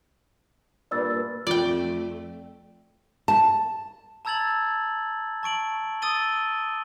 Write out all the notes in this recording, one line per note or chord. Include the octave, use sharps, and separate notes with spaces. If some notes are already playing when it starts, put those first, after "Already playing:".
G2 A#2 D5 E6 A6
F2 A3 F4 D5 G5
A5
A5 A#5 E6 G#6 A6 F#7
A5 C#6 D7 F#7
D#6 E6 A6 D#7 G7